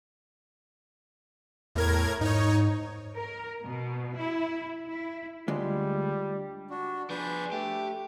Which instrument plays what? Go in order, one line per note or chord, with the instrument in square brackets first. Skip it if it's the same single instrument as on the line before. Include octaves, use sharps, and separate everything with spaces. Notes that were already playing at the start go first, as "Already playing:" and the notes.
[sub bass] E2 [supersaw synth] A2 A#4 G#6
[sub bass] G#2 [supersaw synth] D#4 C#5
[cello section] A#4
B2
E4
E4
[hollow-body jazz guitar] D2 G#3 [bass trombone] G3 [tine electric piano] D4 F4 D5
[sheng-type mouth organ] D4 F#4
[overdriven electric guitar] F3 G#4 [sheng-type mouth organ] D4 B4 G6
[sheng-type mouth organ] A3 [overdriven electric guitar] G4